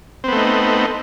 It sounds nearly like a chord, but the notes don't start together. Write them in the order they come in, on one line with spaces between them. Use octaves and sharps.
C4 B3 A3 D#4